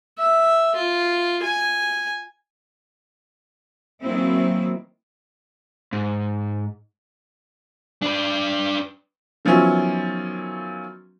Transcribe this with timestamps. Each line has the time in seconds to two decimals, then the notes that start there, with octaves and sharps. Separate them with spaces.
0.18 E5
0.75 F4
1.42 G#5
4.01 D#3 E3 F#3 A#3 C4 E4
5.93 G#2
8.02 D4 B4
9.45 D#3 F3 F#3 B3 C#4 E4